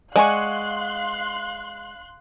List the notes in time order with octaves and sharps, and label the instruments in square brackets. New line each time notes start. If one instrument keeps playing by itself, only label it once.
[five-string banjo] G#3 [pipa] D5 G#5 [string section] F5 C6 F#6 [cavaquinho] F#5 C#6